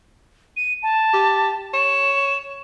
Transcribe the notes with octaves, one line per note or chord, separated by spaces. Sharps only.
D#7
A5
G4
C#5 E7